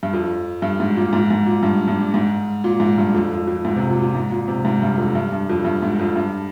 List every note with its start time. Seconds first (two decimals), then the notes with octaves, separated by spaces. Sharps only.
0.03 G2
0.13 F2
0.62 G2
0.80 G#2
0.97 A#2
1.13 G#2
1.30 G#2
1.46 A#2
1.63 G2
1.88 G2
2.14 G#2
2.64 A#2
2.80 G#2
2.98 G2
3.14 F2
3.31 F2
3.47 F2
3.65 G#2
3.76 C3
3.90 A#2
4.02 A#2
4.15 G#2
4.31 A#2
4.48 C3
4.65 G#2
4.82 G2
4.98 F2
5.15 G2
5.32 G2
5.49 F2
5.65 G2
5.82 G#2
5.99 F2
6.16 G2